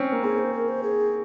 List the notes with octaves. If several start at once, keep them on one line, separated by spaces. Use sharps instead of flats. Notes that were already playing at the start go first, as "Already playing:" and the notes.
Already playing: C4 C#4
A#3
C4 G#4
C5
A#4
C5
G#4